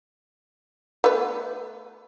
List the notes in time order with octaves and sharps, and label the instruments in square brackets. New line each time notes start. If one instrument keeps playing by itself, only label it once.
[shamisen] A3 B3 B4